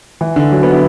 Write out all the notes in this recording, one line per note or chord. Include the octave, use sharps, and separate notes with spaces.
E3
D3
F#3
B3
E4